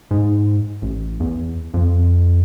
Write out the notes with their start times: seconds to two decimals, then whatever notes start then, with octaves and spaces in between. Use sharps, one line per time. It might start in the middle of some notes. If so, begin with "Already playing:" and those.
0.11 G#2
0.82 A1
1.20 E2
1.74 F2